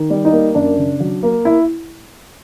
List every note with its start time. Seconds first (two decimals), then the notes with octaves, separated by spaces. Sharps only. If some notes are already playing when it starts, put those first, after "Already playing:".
Already playing: D#3
0.10 G3
0.25 D#4
0.32 A#3
0.55 F#2 D4
0.78 C#3
1.00 F#3
1.23 A#3
1.45 E4